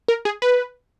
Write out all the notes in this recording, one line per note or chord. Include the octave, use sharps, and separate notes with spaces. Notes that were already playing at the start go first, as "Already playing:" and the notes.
A#4
G#4
B4